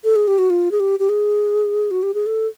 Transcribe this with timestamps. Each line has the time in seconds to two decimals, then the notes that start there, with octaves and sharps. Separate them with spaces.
0.04 A4
0.16 G#4
0.27 G4
0.38 F#4
0.50 F4
0.71 G#4
0.80 G4
1.00 G4
1.09 G#4
1.91 F#4
2.03 G4
2.14 G#4
2.26 A4